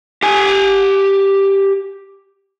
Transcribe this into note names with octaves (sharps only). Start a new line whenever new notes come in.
G4 G#5